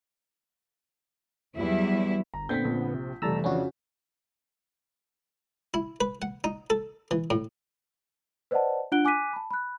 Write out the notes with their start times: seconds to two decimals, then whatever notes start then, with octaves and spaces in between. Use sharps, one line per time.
1.54 E2 F#3 G3 E4
2.34 G1 A#5
2.49 A#2 D3 B3 C4 G6 B6
2.65 A#1
2.94 C3
3.22 F1 E3 G3 A3 A5 A#5 E6
3.44 F2 C#3 C#4 D4 F#4
5.74 E4
6.01 B4
6.22 F#5
6.44 D#4
6.70 A4
7.11 E3
7.30 A2
8.51 B4 C5 D5 D#5 F#5 A5
8.92 D4 F4 F#5 F#6 D7 G7
9.05 G#5 D6 F#6 B6 D#7
9.33 A5 B5
9.51 B5 F#6